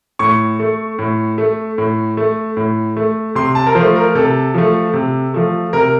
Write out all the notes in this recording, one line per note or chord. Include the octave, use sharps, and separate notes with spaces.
A2 C#6
A3
A2
A3
A2
A3
A2
A3
C3 C6
A5
A#4
F3 A3 C5
A#4
C3 A4
F3 A3
C3
F3 A3
C3 A#4